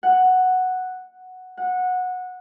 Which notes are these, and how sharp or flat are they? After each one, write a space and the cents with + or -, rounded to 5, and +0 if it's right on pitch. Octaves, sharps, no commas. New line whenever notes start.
F#5 +0
F#5 -15